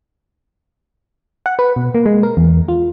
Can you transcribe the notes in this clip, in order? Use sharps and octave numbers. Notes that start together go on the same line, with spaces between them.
F#5
B4
B2
A#3
G#3
A#4
E2
F4